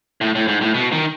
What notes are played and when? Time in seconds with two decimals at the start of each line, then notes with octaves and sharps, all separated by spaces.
0.21 A2
0.35 A2
0.48 G#2
0.61 A2
0.74 B2
0.92 D#3